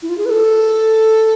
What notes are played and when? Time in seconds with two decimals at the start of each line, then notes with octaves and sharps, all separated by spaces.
0.02 E4
0.09 F4
0.18 G#4
0.26 B4
0.30 A4